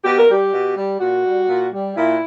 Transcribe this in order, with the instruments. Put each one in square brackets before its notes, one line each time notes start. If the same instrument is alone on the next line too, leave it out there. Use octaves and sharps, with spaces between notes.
[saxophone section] B2 G4
A#4
G3 G4
B2
G3
A#2 F#4
G3
A#2
G3
A#2 E4